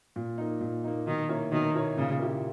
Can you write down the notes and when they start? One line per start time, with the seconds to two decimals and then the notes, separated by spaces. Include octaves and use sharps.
0.16 A#2
0.38 A#3 D#4
0.61 A#2
0.84 A#3 D#4
1.06 B2 D#3
1.29 A#3 E4 A#4 C#5
1.52 B2 D#3
1.74 A#3 E4 A#4 C#5
1.97 A#2 C#3
2.19 A#3 E4 G4